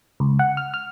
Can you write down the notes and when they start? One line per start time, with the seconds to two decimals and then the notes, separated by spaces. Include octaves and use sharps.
0.20 C#2
0.39 F#5
0.57 F6
0.74 F6